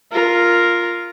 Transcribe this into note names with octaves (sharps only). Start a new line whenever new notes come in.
F4 A#4